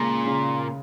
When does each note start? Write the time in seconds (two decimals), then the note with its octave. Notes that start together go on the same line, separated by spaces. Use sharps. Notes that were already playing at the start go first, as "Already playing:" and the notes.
Already playing: A#2 C#3 G#3
0.26 C#3